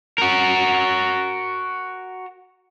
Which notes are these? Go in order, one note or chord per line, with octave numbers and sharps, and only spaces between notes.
F#4 A#4